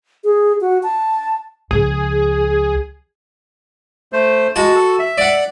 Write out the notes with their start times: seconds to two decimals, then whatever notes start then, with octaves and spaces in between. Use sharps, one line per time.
0.24 G#4
0.61 F#4
0.83 A5
1.71 C#2 F3 G#4
4.13 A3 C5
4.56 G#3 F#4 A5
4.76 A4
4.99 E5
5.18 D5 F#5